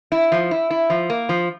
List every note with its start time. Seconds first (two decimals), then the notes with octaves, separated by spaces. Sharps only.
0.12 E4
0.32 F3
0.51 E4
0.70 E4
0.90 F3
1.10 A#3
1.29 F3